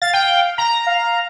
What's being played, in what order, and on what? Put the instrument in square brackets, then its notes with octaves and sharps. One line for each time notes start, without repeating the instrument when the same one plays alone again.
[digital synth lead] F5 [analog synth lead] A6
[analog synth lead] G5
A#5
[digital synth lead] F5